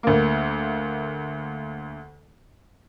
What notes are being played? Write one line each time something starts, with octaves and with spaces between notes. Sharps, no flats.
D2 A#3